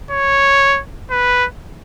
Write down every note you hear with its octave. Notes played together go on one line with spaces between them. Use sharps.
C#5
B4